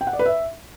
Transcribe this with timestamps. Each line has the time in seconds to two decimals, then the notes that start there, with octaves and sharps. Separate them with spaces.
0.01 G5
0.07 F#5
0.13 D5
0.19 B4
0.26 E5